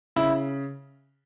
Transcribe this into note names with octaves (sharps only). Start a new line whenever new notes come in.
C#3 E4